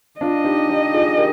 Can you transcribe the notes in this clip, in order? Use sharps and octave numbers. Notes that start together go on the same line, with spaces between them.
D4 F4 D#5
D#4 G4
D#4 G4
F4 G#4
G4 A#4